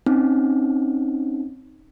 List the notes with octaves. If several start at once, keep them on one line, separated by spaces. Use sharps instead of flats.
C4 C#4 D#4